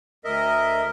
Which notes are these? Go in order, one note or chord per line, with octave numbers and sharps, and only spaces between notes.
D2 A#4 D#5 E5